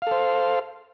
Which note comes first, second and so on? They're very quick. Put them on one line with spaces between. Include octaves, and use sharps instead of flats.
F5 A4 C5